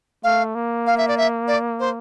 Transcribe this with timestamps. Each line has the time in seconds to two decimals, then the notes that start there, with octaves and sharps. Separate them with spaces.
0.24 A3 F5
0.55 A#3
0.86 F5
0.97 E5
1.08 D5
1.17 E5
1.48 D5
1.80 C5